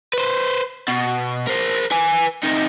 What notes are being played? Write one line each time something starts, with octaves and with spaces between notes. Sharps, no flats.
B4 C5
B2
A#4 C5
B4 G#5
C3 D#4